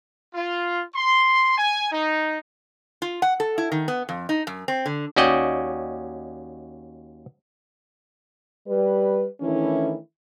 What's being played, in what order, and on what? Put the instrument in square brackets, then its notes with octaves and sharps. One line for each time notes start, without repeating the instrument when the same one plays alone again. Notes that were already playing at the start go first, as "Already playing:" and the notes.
[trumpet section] F4
C6
G#5
D#4
[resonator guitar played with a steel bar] F4
F#5
A4
E4
D#3
B3
F2
D#4
F#2
C4
D3
[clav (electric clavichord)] D#2 C#4 F#4 D5 D#5 G5
[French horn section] G3 B4
D#3 E3 A3 C#4 D4 E4